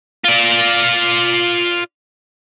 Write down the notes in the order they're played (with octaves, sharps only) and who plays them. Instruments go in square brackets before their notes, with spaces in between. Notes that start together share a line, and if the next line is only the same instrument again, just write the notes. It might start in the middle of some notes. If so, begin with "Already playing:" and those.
[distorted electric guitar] F4 D5